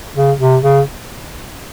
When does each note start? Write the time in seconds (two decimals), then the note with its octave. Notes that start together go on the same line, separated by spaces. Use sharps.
0.15 C#3
0.39 C3
0.63 C#3